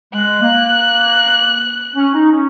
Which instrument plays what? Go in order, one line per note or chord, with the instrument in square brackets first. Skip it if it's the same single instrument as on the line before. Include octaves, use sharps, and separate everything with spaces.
[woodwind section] G#3 [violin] F#6
[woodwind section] A#3
C#4
D#4
C#4